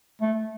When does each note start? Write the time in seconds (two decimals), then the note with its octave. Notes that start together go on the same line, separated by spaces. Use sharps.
0.22 A3